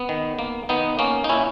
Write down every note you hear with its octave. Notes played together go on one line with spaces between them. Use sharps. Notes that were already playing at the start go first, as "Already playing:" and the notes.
Already playing: B3
D#3
A#3
D#3 B3 D#4
A#3 C#4
D#4
A#2 C#4 E4